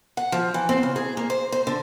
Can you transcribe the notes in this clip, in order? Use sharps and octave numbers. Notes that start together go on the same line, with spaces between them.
F#5
F3
E3
C4
C#3
G#4
A#3
C5
C5
D3